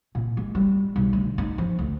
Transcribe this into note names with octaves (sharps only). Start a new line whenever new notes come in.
A#2
G#3
G3
B1
D2
D#4
F3
D2